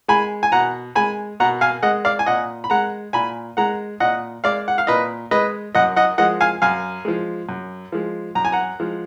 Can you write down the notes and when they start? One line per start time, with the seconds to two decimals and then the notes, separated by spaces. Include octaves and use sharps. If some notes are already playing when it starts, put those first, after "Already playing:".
0.08 G#3 G#5 B5
0.43 G#5
0.52 B2 F#5 A#5
0.95 G#3 G#5 B5
1.40 B2 F#5 A#5
1.61 F5 G#5
1.83 G#3 D#5 F#5
2.05 D5 F5
2.19 G#5
2.26 A#2 D#5 F#5
2.64 B5
2.70 G#3 F#5 A#5
3.13 A#2 G#5 B5
3.57 G#3 F#5 A#5
4.00 A#2 D#5 F#5
4.44 G#3 D5 F5
4.68 F#5
4.78 F5
4.87 A#2 B4 D#5
5.31 G#3 B4 D#5
5.75 F#2 D#5 F#5
5.96 D#5 F#5
6.18 F3 G#3 D#5 F#5
6.41 F5 G#5
6.62 F#2 F5 G#5
7.05 F3 G#3
7.49 F#2
7.92 F3 G#3
8.35 F#2 A#5
8.45 G#5
8.52 F#5 A#5
8.80 F3 G#3